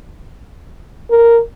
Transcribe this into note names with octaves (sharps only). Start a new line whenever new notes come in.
A#4